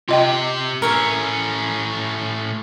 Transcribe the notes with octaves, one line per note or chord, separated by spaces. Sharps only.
C3 F4 G4 D#5 G5
A2 C#4 A#4 C#5 E5